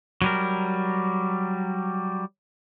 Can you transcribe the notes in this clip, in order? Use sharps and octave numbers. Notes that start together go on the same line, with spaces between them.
F#3 G3 A#4